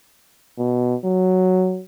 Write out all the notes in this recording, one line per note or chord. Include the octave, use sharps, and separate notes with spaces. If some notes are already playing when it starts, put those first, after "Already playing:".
B2
F#3